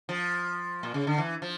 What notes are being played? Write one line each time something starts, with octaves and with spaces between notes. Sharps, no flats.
F3
A#2
C#3
D3
E3
F3